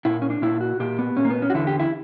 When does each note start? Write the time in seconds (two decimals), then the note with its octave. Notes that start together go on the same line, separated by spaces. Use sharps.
0.05 A#2 E4
0.22 C#4
0.30 D4
0.42 A#2 E4
0.61 F#4
0.80 A#2 G4
0.99 B3
1.17 A#2 C#4
1.25 A#3
1.30 B3
1.42 C#4
1.50 F#4
1.54 E2 D3 E4
1.67 G4
1.80 E4